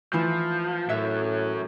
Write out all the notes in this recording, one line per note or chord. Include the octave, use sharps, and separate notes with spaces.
E3 F3 A3 E4
F#2 A2 F#3 E5